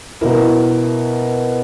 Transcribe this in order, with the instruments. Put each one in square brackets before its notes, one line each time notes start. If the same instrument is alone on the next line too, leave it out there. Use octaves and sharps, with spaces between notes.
[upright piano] B2 A#3 E4 A#4